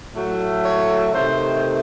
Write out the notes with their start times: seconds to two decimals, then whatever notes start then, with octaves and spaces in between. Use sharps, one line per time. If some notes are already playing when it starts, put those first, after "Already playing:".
0.14 A2 F#3 A3
0.64 C#5
1.12 C3 D#3 A3 C5